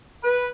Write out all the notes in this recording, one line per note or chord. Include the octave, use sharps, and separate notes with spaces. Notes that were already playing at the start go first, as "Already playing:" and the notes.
B4